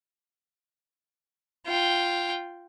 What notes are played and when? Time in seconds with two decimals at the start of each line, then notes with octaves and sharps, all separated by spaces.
1.67 F4 G5